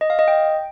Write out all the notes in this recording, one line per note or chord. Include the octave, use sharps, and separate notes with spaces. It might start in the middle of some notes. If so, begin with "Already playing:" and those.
D#5
F5
D#5
G5